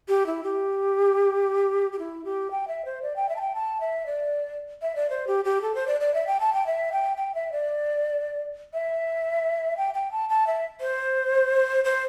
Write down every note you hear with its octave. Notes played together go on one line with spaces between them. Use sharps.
G4
E4
G4
G4
E4
G4
G5
E5
C5
D5
G5
E5
A5
G5
A5
E5
D5
E5
D5
C5
G4
G4
A4
C5
D5
D5
E5
G5
A5
G5
E5
G5
G5
E5
D5
E5
G5
G5
A5
A5
E5
C5
C5